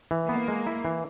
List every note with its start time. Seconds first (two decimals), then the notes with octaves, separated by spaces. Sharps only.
0.11 E3
0.29 A#3 B3
0.48 G#3
0.67 E4
0.85 E3